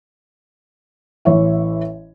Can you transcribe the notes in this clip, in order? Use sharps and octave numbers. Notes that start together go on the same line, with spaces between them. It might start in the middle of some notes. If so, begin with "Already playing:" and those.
A1 E3 C#5 E5